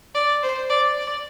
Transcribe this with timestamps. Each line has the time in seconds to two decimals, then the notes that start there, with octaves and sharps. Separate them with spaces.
0.15 D5
0.43 C5
0.70 D5
0.98 D5